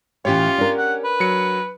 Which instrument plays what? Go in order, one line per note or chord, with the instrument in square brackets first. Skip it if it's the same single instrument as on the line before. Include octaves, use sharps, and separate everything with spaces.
[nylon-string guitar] A2 E3 [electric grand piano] C#4 G4 C#5 [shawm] F4
[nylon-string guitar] D4 A#4
[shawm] F#5
B4
[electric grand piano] F#3 C#7